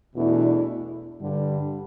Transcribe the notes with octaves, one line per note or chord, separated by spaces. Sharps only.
E2 B2 A3 D4 E4
G2 D3 G3